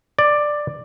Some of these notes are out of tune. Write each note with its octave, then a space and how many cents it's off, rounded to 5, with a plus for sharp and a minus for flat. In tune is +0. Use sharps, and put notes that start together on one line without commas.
D5 +10